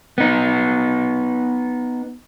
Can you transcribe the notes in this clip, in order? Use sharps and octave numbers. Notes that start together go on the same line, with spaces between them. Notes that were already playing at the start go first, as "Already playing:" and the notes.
B3 D#4